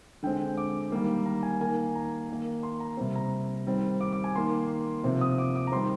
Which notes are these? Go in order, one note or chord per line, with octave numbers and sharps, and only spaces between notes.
D3 G#3 C4 G5
D6
D#3 G3 A#3
A#5
G#5
D#3 A#3 G#5
A#5
D#3 A#3
C6
A#5
C3 G3 C4
A#5
D#3 G3 C4
D6
D6
G#5
D#3 A#3 C6
C3 F3 C4
D#6
D6
D6
A#5
D#3 G3 C4 C6